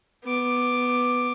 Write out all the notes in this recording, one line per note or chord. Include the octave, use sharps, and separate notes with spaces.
B3 D6